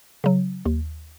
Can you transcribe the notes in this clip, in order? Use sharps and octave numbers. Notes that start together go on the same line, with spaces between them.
C#3 F#3
D#2